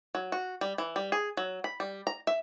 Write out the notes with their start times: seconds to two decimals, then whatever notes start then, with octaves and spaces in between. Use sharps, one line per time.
0.15 F#3
0.32 F#4
0.61 G3
0.78 E3
0.96 G3
1.12 G#4
1.37 F#3
1.64 B5
1.80 G3
2.07 A#5
2.27 E5